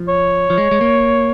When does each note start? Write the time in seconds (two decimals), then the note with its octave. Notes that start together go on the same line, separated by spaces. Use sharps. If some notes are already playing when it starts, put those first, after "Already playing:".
Already playing: F3
0.08 C#5
0.50 F3
0.58 G#3
0.71 G#3
0.81 A#3